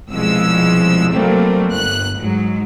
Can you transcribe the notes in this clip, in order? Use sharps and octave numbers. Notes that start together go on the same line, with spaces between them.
C2 B2 F3 G#3 E6
F#3 G3 A3 A#3 C4
G1 F#6
G#2 F#3